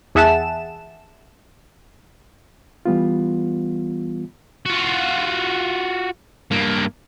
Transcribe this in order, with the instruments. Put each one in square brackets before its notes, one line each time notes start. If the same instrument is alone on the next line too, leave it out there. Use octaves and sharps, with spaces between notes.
[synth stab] E2 G#4 E5 F#5 A5 E7
[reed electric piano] E3 G3 B3 F4
[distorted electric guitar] F4 F#4
G2 A#3